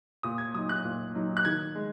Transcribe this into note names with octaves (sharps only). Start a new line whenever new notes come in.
A#2 D#6
G#6
F#3 D#4 D#6
F#6
A#2
F#3 D#4
F#6
D#3 G#6
G#3